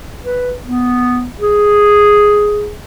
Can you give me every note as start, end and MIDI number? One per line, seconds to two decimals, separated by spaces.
0.24 0.52 71
0.66 1.27 59
1.40 2.73 68